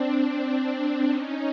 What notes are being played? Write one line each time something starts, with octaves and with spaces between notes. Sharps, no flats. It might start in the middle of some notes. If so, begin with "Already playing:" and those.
Already playing: C4 D4
C#4 D#4